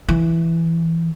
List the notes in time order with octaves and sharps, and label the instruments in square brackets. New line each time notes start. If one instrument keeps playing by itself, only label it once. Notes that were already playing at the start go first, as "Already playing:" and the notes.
[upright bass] E3